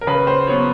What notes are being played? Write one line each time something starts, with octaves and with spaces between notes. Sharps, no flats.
A#4
C#3 B4
C5
F#3 B3 C#5